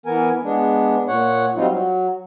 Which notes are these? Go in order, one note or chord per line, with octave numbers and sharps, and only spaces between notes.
E3 B3 A#4 G#5
G#3 B3 D4
A#2 C#5 F#5
F#3 G3 C4 D#4 F4
F#3